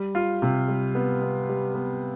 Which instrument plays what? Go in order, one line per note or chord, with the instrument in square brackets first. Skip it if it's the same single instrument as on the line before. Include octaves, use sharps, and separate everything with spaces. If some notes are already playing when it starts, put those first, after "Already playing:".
Already playing: [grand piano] G3
F4
C3
G3
B3
B3
G3
B3